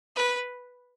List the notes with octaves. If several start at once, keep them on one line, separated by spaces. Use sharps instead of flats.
B4